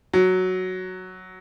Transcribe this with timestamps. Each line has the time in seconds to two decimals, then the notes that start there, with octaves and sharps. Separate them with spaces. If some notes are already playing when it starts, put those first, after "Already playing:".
0.13 F#3